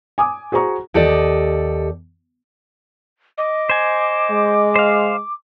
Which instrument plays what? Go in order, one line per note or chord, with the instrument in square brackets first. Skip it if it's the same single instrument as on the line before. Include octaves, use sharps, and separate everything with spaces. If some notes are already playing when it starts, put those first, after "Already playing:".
[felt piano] G#5 D6 D#6
F#4 G#4 C5 A#5 C#6
[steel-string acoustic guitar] D#2 G4 A4 D5 D#5
[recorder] D#5 [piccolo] D6
[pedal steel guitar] C5 G#5
[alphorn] G#3
[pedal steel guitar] C5 F5